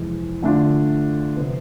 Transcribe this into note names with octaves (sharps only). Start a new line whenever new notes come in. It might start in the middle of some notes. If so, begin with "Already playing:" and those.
Already playing: F2 C3 E3 G#3
D3 A3 D4 F4
C3 F3 B3